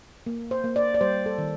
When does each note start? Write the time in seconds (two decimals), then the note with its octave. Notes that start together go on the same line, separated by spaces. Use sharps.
0.26 A#3
0.51 C5
0.64 A#3
0.76 D5
0.94 D5
1.01 G3 C5
1.26 A4
1.38 D#3